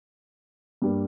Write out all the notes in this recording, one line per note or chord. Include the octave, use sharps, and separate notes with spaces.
G2 G3 A#3